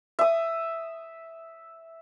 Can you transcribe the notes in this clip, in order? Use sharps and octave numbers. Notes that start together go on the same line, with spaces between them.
E5 D#6